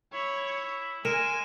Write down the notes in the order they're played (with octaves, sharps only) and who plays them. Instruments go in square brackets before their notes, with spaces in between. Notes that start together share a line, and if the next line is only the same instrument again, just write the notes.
[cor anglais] E4 [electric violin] C#5
[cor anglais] G#3 [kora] A#4 [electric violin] G#5 [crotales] D#7 E7